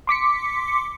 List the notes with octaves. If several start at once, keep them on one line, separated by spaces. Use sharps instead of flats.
C6 D6 B6 C#7